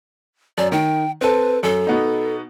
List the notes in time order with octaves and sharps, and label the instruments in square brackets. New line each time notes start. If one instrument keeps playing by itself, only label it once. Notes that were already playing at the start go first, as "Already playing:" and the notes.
[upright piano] F#2 [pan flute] D5
[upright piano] D#3 [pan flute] G5
[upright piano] C4 A4 [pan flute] B4
[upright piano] F#2 [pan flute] A4
[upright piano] B2 B3 D#4